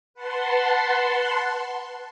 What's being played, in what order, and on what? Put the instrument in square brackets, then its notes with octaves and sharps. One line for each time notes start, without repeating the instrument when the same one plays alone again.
[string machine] B4 F#5 A5 C6